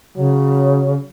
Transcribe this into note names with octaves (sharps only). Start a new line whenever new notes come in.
C#3 F#3